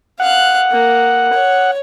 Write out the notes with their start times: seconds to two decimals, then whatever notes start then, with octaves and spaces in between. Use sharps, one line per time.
0.20 F5 F#5 F#6
0.71 A#3
1.33 C#5